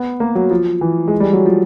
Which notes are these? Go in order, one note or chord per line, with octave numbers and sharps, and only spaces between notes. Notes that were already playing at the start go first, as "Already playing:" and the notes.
Already playing: B3
A#3
F#3
F3
E3
G#3
G3
F#3
F3